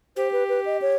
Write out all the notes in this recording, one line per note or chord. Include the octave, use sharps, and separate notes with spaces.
G4 C5
B4
B4
D#5
C#5